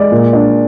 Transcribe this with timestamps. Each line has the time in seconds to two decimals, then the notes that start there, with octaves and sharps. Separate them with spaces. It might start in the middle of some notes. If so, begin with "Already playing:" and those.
Already playing: G#3 D5
0.12 A#2
0.33 D4